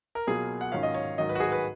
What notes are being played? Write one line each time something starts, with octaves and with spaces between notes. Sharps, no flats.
A#4
B2 F#3 A#3 F4 G#4
F#5
G#2 D#3 F#3 C#4 F4 F5
D#5
C#5
G#2 D#3 F#3 D#5
B4
F#4
G#4
B4